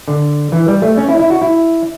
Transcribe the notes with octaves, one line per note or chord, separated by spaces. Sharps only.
D3
E3
G3
A3
C#4
E4
E4
F#4
E4